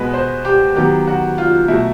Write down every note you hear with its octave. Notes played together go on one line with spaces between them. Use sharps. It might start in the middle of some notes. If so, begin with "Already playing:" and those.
Already playing: B2 G#3 B3 B4
C5
G4
D#3 F#3 B3 G4
F#4
F4
B2 F#3 A3 E4